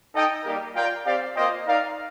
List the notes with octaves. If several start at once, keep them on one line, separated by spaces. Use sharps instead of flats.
D#4 A4 D#5 G5
G3 A#3 D#4 G4 A#4
F4 A#4 D5 G5
C4 G4 D5 F5
A#3 F4 C5 D#5 G5
D#4 A#4 D5 F5